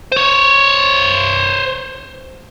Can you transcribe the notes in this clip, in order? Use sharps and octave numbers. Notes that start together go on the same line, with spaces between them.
C5 C#5